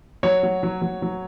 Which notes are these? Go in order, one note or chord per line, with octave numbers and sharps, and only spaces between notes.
F#3 C#5
F#3
F#3
F#3
F#3